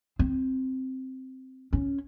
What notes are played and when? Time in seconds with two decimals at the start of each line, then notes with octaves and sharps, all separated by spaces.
0.19 C4
1.73 C#4